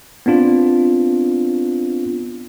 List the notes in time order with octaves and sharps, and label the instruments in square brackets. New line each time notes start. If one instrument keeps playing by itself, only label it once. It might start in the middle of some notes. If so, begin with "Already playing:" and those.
[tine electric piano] B3 C4 D4 F4